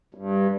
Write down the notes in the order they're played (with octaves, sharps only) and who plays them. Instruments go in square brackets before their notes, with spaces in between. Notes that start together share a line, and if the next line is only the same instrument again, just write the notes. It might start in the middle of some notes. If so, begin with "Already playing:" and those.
[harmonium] G2